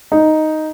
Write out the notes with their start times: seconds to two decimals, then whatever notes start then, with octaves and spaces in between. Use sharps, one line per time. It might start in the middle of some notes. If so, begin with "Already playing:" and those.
0.12 D#4